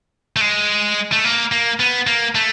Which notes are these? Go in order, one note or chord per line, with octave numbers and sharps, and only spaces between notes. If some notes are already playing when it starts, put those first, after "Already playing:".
A3
G#3
A3
A#3
A#3
B3
A#3
A3